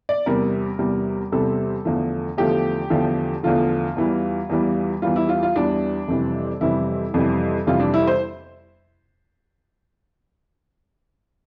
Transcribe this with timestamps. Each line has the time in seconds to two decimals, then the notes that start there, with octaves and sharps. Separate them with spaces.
0.09 D5
0.26 E2 C3 G3 A#4
0.79 E2 C3 G3
1.32 E2 C3 G3 A4
1.85 E2 D3 F3 A3
2.37 E2 D3 F3 A3 G4
2.90 E2 D3 F3 A3
3.43 E2 D3 F3 A3 F4
3.96 E2 E3 G3
4.49 E2 E3 G3
5.02 E2 E3 G3 F4
5.16 E4
5.29 F4
5.43 F4
5.55 E2 E3 G3 D4
6.08 F2 C3 E3 G3
6.61 F2 C3 E3 G3 E4
7.14 F2 C3 E3 G3
7.67 F2 C3 E3 G3 F4
7.80 D4
7.94 E4
8.07 C5